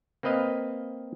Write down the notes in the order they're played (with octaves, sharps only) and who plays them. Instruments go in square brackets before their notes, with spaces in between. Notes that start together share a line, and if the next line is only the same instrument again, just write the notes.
[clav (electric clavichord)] A#3 C4 B4 D#5 F5